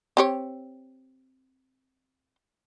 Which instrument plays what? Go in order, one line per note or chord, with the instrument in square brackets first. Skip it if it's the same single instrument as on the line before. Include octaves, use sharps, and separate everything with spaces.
[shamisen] C4 G4 C#5